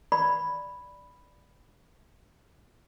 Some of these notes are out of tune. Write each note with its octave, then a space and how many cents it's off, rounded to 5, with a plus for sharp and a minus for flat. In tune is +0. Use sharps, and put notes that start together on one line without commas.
D5 +0 B5 +0